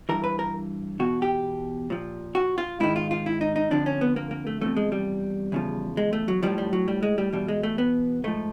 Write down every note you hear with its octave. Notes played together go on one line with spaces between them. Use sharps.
G2 E3 A#4
B4
A#4
E2 B2 F#4
G4
A#2 F3
F#4
F4
G#2 D#3 E4
F4
F4
E4
D#4
D#4
F2 D3 F3 D4
C#4
B3
A#3
A#3
A3
E2 C3 F3 A3
G#3
G3
E2 C#3 F3
G#3
A3
F#3
A2 F3 G3
G3
F#3
G3
G#3
G3
E2 B2 G3
G#3
A3
B3
G#2 F3 A3